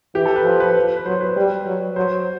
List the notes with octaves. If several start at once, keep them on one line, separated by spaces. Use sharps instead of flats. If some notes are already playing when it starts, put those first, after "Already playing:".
E3 G4
A4
B4
F3
B4
B4
B4
F#3 C5
B4
G3
F#3
F#3 C5